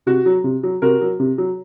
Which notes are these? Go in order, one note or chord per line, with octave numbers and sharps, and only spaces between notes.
C3 F#4
F#3
C3
F#3
C3 F#4 A#4
F#3
C3
F#3